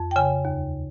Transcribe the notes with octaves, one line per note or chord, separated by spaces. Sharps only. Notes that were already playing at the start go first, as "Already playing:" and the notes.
Already playing: F2
G5
C#3 G#5
D#2